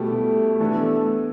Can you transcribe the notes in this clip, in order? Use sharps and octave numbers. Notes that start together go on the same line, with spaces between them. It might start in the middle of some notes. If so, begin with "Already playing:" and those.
Already playing: B2 G3 A3 E4 G4
E3 A3 B3 D4 A4